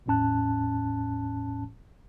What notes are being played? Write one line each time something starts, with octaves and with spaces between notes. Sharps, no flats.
G#1 E2 A2 C#4 A5 F#6